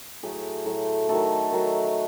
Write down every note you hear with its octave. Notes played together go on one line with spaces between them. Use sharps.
A2 F#3 A3 G#4
A2 F#3 A3
D#3 F#3 A3 A4
D#3 F#3 A3